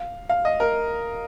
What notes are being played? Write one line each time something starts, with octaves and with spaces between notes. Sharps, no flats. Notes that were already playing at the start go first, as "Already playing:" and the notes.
Already playing: F5
F5
D#5
A#4